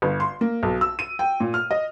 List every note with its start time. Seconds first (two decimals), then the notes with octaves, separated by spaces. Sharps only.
0.02 G1
0.20 C6
0.41 A#3
0.63 B1
0.81 E6
0.99 D#7
1.19 G5
1.40 A#2
1.54 F6
1.71 D#5